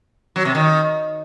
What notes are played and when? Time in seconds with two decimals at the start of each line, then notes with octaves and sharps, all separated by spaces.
0.36 F#3
0.45 C3
0.55 D#3